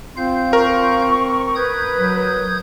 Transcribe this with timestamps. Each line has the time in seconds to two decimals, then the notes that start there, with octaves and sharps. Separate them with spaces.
0.17 C4 F4 F5 G6
0.53 A#4 C#6
1.55 B4 D#6 G6 G#6
1.97 F#3